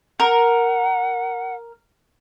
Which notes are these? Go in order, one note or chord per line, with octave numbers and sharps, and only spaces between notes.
A#4 F#5